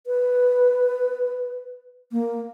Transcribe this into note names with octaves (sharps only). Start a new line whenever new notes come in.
B4
A#3